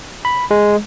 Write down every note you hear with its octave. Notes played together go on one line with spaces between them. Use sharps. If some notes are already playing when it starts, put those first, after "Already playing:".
B5
G#3